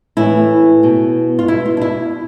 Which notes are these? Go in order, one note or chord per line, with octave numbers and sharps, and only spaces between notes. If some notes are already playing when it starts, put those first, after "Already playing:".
A2 E3 E4
B2
F4
B2 E4
F4
D4
E4